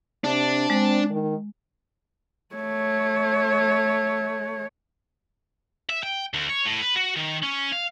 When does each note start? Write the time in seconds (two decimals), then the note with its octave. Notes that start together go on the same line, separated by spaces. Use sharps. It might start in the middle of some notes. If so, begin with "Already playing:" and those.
0.24 C3 D4
0.70 G#3 C4
1.10 D#3
2.55 A3 C#5
5.90 E5
6.03 G5
6.34 D2
6.49 C#5
6.65 A2
6.82 B4
6.96 F#4
7.16 D#3
7.43 C#4
7.73 F5